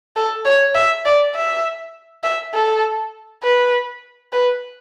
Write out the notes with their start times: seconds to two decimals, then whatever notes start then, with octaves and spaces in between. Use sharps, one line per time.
0.16 A4
0.45 C#5
0.75 E5
1.05 D5
1.35 E5
2.24 E5
2.54 A4
3.43 B4
4.33 B4